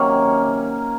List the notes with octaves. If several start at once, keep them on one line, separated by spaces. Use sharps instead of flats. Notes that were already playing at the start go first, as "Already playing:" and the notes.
Already playing: C3 D#3 F#3 A#3 C#4